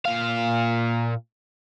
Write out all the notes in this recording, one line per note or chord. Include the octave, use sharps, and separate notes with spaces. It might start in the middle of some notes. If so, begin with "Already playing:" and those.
A#2 F5